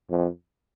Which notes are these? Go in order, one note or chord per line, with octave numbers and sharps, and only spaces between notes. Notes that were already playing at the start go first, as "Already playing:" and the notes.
F2